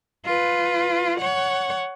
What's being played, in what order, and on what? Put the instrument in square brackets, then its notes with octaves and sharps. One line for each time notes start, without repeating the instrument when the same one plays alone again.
[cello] F4 B4
C#5 F#5